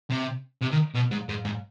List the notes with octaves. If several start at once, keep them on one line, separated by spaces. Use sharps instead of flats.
C3
C3
D#3
B2
G#2
G#2
G#2